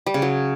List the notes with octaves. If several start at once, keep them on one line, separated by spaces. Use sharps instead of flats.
G3
C#3
F#3